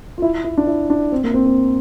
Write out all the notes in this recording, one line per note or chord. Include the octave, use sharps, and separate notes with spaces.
F4
E4
E4
D4
E4
D4
C4
A#3
C4
C4